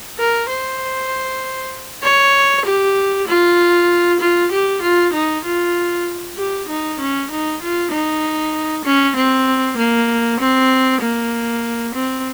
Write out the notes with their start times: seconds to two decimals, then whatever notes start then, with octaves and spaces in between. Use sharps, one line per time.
0.19 A#4
0.49 C5
2.03 C#5
2.65 G4
3.28 F4
4.20 F4
4.52 G4
4.82 F4
5.13 D#4
5.45 F4
6.37 G4
6.68 D#4
7.00 C#4
7.31 D#4
7.62 F4
7.92 D#4
8.85 C#4
9.16 C4
9.78 A#3
10.40 C4
11.02 A#3
11.95 C4